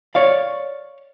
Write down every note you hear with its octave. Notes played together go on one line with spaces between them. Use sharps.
C#5 D5 F5